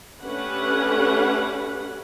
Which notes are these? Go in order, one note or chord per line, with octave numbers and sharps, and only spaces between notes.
A3 C#4 D4 G4 B4 F#5